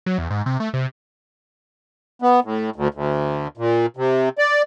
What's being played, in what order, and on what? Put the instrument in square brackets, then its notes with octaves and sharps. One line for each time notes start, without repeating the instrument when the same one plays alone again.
[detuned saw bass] F#3
E2
G#2
C3
A3
C3
[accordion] B3
A2
D2
D2
A#2
C3
D5